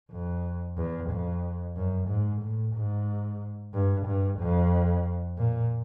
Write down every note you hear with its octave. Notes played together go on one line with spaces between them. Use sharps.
F2
E2
F2
F#2
G#2
A2
G#2
G2
G2
F2
A#2